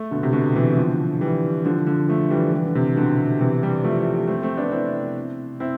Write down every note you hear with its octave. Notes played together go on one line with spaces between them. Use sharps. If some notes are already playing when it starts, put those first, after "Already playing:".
Already playing: A3
B2 D3
C3
B2 D3
C3 E3
D3 F3
E3 G3
D3 F3
D3 F3
F3 A3
E3 G3
E3 G3
D3
C3
B2 D3
C3 E3
E3 G3
F3 A3
A3 C4
A3 C4
B3 D4
C4 E4
C4 E4